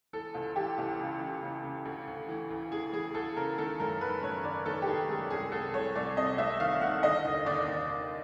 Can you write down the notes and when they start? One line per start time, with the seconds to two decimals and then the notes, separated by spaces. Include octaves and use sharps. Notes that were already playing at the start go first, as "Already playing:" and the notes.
0.13 E3 A4
0.35 C#2
0.56 E3 G4
0.78 C#2
0.99 C#3
1.21 E3
1.43 C#3
1.64 C#3
1.85 D2
2.07 D2
2.28 E3
2.50 D2
2.72 E3 G#4
2.93 E3 G#4
3.14 D2 A4
3.36 C#3 A#4
3.58 D#3 A4
3.80 F#2 A#4
4.01 D#3 B4
4.23 F#2 C#5
4.44 D#3 D5
4.66 D#3 A4
4.82 G4
4.87 D#3 G#4
5.09 F#2 G#4
5.30 C2 G#4
5.52 C2 A4
5.74 C2 C#5
5.95 C2 D5
6.17 C3 D#5
6.38 C2 E5
6.60 D#3 F5
6.81 D#3 F#5
7.03 D3 D#5
7.25 D#2
7.46 D#2 D5
7.68 D#2
7.89 D#2